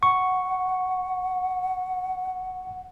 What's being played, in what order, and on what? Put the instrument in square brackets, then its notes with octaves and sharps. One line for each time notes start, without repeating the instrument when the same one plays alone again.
[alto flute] F#5 [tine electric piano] C#6